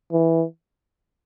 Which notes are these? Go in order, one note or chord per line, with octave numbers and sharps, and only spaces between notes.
E3